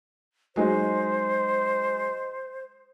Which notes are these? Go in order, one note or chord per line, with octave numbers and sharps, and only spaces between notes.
F#3 G#3 D#4 C5